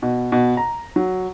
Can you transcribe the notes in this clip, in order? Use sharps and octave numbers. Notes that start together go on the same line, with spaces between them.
B2
B2
A#5
F#3